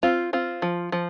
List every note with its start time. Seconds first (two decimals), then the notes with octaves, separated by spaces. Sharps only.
0.03 C4 F4
0.33 C4 F4
0.62 F3
0.92 F3